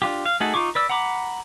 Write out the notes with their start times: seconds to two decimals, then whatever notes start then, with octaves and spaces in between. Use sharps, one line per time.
0.02 D4 F4 G4
0.26 F5
0.40 A3 D#4 F#4 G#4 A4
0.54 D#4 F4 C#6 D6
0.75 B4 D5 E6
0.90 F#5 A#5 B5 D6